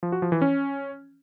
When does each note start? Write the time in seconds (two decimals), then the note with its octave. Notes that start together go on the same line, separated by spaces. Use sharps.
0.03 F3
0.12 F#4
0.22 F3
0.32 E3
0.42 C#4